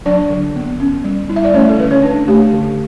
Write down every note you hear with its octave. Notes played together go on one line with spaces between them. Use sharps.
F#3 D4 D5
D3
B3
C#4
G3
E4
E5
D5
A3 C#4 C#5
A4
D3 B4
C#4 C#5
D4
A3 G4
D3